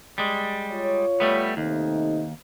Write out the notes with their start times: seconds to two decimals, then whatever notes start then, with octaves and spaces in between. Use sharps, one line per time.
0.18 G3 G#3
0.72 F4 C#5
1.20 G3 A3 B3
1.57 D#2 C3 A3 D#4